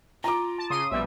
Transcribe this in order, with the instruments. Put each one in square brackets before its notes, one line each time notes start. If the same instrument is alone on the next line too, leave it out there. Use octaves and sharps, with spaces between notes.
[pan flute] F4 [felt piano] A#5 D6
[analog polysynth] A5
[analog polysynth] C#3 C6 D#7 [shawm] D#6
[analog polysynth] A#1 B2 G3 [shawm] E5